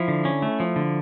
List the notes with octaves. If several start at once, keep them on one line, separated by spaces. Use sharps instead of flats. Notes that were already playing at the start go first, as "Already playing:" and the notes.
Already playing: F3 E4
D3
C#4
A3
F3
D3